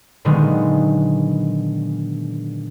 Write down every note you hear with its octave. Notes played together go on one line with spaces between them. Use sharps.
A#2 D3 D#3 F#3 G#3 B3